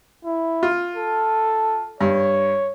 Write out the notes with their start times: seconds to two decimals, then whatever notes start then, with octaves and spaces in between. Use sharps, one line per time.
0.25 E4
0.63 F4
0.95 A4
2.01 G2 C#5